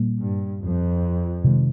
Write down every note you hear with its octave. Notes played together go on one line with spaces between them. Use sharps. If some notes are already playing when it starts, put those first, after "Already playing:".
Already playing: A#2 G3 A#3
G2
F2
C3 D#3 G#3